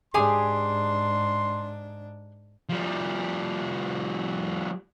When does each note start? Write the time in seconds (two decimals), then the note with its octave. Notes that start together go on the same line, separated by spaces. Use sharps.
0.14 G#2 D4 G4 G#4 G#5 C6
2.69 F3 G3